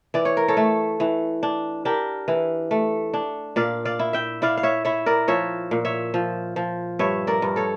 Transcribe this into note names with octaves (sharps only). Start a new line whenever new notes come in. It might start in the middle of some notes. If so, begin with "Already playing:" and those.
E3 D5
C#5
A#4
A4 C#5
A3
E3
D4
D4 G4 A#4
E3
A3
D4
A#2 D5 F5
D5 F5
E4
E5 G5
E4 D5 F5
F5
C#5 E5
E4 C#5 E5
A#4 D5
F3 C#5 E5
A#2
C#5 E5
F3
F3
G2 C#5 E5
A#4 D5
G2
A4 C#5